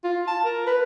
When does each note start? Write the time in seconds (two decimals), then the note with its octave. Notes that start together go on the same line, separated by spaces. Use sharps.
0.04 F4
0.27 A5
0.44 A#4
0.67 B4